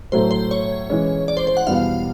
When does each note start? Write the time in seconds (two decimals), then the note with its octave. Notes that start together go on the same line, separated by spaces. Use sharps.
0.12 A2 F#3 A3 C5
0.31 C5
0.51 C#5
0.89 E3 G#3 C#4
1.28 D5
1.37 C5
1.47 C5
1.57 F#5
1.67 E2 B2 G3 B3 E4 F5